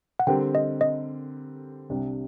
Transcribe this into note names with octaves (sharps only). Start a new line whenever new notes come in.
F#5
D3 G3 C4 G4 A#4 G5
D#5
D#5
C2 C3 G3 D4